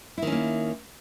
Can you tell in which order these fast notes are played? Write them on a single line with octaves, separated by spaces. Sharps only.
E4 D#3 C#4 A#3